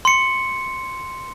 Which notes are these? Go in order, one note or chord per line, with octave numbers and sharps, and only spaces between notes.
C6 C#7